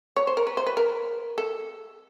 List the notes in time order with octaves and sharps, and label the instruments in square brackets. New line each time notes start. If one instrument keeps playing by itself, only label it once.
[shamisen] C#5
C5
A#4
B4
C5
B4
A#4
A4